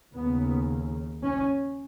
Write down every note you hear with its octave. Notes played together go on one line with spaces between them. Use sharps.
D#2 C#3 B3
C#4